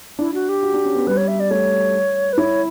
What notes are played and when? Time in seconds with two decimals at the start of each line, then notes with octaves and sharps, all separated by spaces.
0.19 D4 E4
0.34 F#4
0.49 G4
0.63 F#4
0.74 D4
0.85 C#4
0.95 B3
1.07 G3 B4
1.17 C#5
1.28 E5
1.40 D5
1.51 A3 C#5
2.33 B4
2.38 E4 C#5